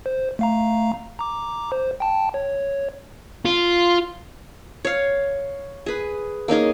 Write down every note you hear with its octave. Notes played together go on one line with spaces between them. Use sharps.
C5
A3 F5 A#5
A#5 D6
C5
G5 A5
C#5
F4
C#5 F5
G#4 B4
A#3 C#4 D#4 G#4